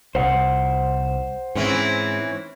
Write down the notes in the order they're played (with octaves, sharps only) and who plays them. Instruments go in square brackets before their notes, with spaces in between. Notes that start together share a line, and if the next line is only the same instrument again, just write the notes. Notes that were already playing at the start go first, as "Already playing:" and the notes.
[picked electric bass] C2 [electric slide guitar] C5 F#5
[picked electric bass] G#2 [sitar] E3 C4 C#4